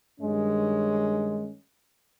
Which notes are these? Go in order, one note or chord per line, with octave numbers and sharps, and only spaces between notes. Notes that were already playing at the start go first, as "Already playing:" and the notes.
G2 D#3 G#3 C#4